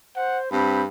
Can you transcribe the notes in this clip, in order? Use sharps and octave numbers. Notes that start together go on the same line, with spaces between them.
C5 F#5
G2 C4 B5